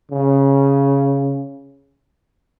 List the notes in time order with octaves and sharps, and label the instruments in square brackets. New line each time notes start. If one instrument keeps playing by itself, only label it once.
[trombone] C#3